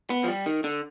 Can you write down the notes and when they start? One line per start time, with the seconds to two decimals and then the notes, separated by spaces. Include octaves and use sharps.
0.10 B3
0.24 F3
0.28 G3
0.46 D#3
0.64 D3